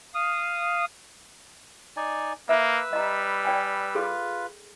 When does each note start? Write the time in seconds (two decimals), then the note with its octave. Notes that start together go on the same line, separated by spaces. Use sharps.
0.14 F5 D#6
1.97 D#4 D5 G#5
2.49 A#3 B4 E5 E6
2.93 G3 D#5 A#5
3.45 D5 G5 G#5
3.95 F4 G#4 A4 B4